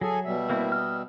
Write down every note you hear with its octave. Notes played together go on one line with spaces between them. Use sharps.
F#3 G#4 A4 G#5
B2 G3 E5
A#3 C4 E4
D#5 F6